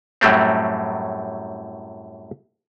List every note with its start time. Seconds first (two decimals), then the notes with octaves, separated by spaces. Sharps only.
0.21 F#2 A2 F#3 G3 A3 C4